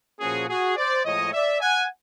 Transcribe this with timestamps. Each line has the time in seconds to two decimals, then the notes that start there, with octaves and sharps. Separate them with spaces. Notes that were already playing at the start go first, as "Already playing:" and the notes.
0.20 A#2 F3 A#3 C#4 F#4 G#4
0.48 F#4 G#4
0.77 C5 D5
1.04 A2 F3 G#3 C#5 D#5
1.33 D5 E5
1.61 F#5 G#5